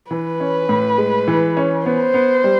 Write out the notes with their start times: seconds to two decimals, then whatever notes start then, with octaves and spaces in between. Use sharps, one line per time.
0.11 E3 B4
0.40 C#4
0.69 A2
0.98 G#3
1.28 E3
1.57 C#4
1.86 B3 C5
2.14 B3
2.44 G3